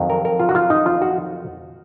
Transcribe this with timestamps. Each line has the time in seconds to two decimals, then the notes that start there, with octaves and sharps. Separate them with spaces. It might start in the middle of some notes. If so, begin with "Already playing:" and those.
Already playing: F2 D#3 F#3
0.10 A#4
0.25 A#4
0.40 F4
0.49 F#4
0.55 F4
0.70 D#4
0.86 F4
1.02 F#4